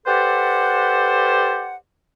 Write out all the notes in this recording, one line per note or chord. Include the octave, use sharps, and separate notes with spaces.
G4 A4 B4 C5 D5 F#5